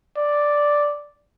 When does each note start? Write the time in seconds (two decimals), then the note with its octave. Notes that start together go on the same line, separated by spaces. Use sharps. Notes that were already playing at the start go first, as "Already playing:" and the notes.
0.17 D5